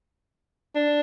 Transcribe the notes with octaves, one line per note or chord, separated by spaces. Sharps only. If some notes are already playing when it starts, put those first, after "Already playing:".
D4